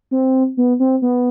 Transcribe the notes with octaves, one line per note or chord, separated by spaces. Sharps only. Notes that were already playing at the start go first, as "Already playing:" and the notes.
C4
B3
C4
B3